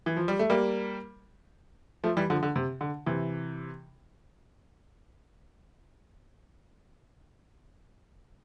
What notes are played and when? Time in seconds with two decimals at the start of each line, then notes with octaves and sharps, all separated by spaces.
0.06 E3
0.17 F3
0.28 G3
0.39 A3
0.50 G3 A#3
2.04 F3 A3
2.17 E3 G3
2.30 D3 F3
2.43 D3
2.56 C3
2.81 D3
3.06 C3 E3